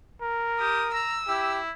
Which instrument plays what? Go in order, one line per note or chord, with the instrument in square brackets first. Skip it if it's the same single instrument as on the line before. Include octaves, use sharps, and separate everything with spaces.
[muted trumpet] A#4
[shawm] G4 [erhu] D#6
[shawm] A#5 [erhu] E6
[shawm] E4 [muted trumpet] G4